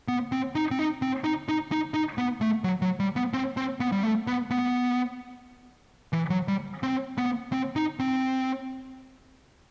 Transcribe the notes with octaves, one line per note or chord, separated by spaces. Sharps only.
B3
C4
D#4
C4
D#4
C4
D#4
D#4
D#4
D#4
B3
A3
F#3
F#3
G3
B3
C4
C4
B3
G3
A3
B3
B3
E3
F#3
G3
C4
B3
C4
D#4
C4